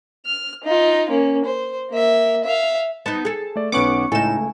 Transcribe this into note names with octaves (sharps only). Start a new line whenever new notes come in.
F6
D#4 F4
A#3 C#4
C5
A#3 E5
E5 F5
B3 D#4 A5
G#4 A4
A3 D5
B1 B3 C#4 B4 F#5 C#6 D6 C#7
C#2 A2 A3 D#4 A4 G#5 E7